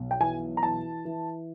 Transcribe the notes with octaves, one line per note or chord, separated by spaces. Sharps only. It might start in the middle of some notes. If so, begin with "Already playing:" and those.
Already playing: B1
G5
E3 G#5
A#5
E3 A5
E3